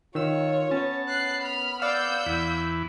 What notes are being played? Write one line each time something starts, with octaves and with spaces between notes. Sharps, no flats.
D#3 F4 C#5 E6
B3 C#4 A5
F#6 C7
B5 F6
D5 F5 F#5 E6 G6
E2 E4